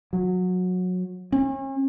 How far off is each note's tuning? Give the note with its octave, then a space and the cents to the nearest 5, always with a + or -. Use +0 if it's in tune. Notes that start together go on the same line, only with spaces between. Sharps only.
F#3 -20
C#4 -40